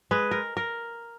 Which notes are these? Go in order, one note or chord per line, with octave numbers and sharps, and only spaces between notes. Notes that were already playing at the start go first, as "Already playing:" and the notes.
G#3 B4
A#4
A#4